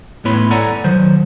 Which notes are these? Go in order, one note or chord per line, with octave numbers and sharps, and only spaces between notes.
A2 B3 E4 C#5 B5 C6
A4 D5 F#5 G#5 A#5
D#3 F#3 C5